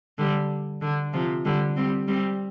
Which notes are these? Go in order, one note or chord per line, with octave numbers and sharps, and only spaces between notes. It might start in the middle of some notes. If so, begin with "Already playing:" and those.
D3 G3
D3
C3 F3
D3 G3
G3 C4
G3 C4